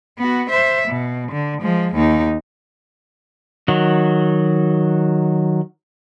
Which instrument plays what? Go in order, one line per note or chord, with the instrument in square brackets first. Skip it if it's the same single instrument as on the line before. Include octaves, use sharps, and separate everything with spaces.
[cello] B3 F#4
C5 E5
B2
D3
F3 G#3
D#2 D#4
[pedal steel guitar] D#3 F#3 F#4